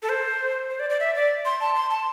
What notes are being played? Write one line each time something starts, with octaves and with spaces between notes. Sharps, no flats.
A4
C5
C5
D5
D5
E5
D5
C6
A5
C6
A5